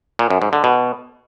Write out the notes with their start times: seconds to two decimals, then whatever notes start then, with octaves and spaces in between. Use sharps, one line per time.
0.19 A#2
0.30 F#2
0.42 G#2
0.53 D3
0.64 B2